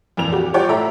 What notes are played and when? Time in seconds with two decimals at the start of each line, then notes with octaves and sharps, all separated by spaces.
0.17 F2 A#2 E3 F7
0.32 F#4 G4
0.54 G3 F4 C#5 D5 F#5 G5
0.69 A2 A4 E5 A#5